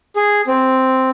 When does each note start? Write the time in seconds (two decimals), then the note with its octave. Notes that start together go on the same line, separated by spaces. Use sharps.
0.16 G#4
0.47 C4